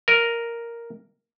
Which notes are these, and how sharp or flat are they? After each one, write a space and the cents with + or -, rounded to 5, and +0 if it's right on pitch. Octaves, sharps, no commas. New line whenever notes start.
A#4 +0 D#5 +5